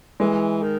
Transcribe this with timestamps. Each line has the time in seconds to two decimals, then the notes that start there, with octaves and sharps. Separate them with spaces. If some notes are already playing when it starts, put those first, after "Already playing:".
0.20 E3 G#3
0.62 D#3